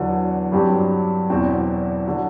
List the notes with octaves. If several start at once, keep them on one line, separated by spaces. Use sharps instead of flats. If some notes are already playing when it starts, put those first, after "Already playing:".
Already playing: E2 D3 F#3 B3
G2 F#3 C4 G4
E2 B2 F#3 C4 F#4
D3 F#3